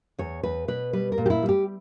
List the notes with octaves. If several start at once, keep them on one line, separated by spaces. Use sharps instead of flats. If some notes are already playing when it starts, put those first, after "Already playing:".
E2 C#5
E2 B4
B2 B4
G3 B4
A#4
A#2
G4
E4
G3
G4